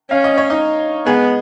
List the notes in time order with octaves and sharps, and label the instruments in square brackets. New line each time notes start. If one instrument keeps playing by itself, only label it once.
[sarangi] C#4 [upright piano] F5
[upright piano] D#5
C#5
D#4 D#5
[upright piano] G#3 G#4 [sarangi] B3